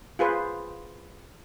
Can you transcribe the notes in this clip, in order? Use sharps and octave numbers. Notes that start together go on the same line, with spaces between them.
F4 G#4 B4 C5